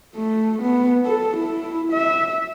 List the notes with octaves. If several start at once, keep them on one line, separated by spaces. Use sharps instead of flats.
A3
B3
A4
E4
E5